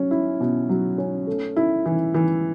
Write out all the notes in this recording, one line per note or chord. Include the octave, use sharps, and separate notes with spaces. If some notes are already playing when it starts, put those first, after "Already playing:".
Already playing: F#3 C#4
E4
B2
F#3
C#4
A3
E4
E3
E3